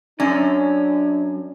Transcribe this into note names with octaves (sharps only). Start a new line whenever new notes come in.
F#2 C#4 D4 D5 G#5